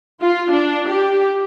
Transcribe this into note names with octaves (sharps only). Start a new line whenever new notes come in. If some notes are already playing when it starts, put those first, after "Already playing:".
F4
D4
G4